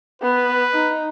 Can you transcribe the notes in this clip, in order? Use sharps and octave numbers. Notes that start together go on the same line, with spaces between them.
B3 B4
D#4